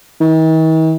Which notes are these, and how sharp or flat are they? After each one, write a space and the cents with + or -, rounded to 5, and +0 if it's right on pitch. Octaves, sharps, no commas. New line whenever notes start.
D#3 +45